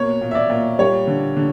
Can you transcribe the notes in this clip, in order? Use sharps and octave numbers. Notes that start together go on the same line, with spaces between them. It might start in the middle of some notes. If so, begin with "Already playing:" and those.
Already playing: B2 A#3 C#5
A#2
E5
D5
A#2
G3 C#5
D3
D3